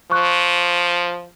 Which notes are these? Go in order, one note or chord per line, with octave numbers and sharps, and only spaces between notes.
F3 C#6 F#6